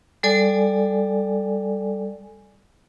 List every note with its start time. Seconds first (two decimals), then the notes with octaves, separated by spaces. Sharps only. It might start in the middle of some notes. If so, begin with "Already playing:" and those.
0.23 G3 A4 D5 G#5